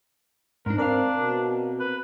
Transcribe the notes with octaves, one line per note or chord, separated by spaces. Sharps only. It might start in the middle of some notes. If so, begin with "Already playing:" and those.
G#2 D4 A#4
C4 D4 A#4 D5 F5
B2
B4